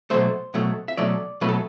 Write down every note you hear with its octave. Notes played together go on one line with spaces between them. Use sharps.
B2 F#3 A3 C5
B2 F#3 A3
E5
B2 F#3 A3 D5
B2 F#3 A3 B4
A4